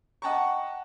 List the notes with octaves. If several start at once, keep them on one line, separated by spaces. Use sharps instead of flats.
D#5 F#5 G5 A5 A#5 C#6